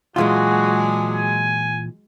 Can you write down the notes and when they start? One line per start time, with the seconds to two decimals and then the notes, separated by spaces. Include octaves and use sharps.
0.16 A#2 E3 F#3 G#3 D4 F4 F#4 G#4
1.15 G#5